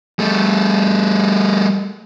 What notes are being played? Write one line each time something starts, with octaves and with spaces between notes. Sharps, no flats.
G3 A3